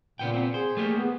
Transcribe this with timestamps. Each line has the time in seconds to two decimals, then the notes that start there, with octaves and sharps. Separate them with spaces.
0.19 A#2 C#3 B3 G5
0.34 B3 C4
0.54 G#4 C5
0.77 A3 A#3 G4
0.98 B3